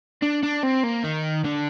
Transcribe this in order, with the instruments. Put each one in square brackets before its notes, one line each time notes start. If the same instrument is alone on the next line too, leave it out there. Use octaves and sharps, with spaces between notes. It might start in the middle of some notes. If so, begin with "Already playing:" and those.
[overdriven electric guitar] D4
D4
C4
A#3
D#3
D3